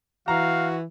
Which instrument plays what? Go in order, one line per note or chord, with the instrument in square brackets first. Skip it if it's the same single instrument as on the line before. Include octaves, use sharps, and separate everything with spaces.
[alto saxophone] E3 [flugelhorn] F#4 [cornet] F5 [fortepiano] A#5